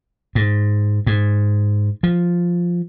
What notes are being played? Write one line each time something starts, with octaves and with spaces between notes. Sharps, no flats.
G#2
G#2
F3